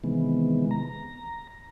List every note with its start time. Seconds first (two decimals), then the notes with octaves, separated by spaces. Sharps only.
0.04 C3 D#3 E3 G#3 B3
0.71 A#5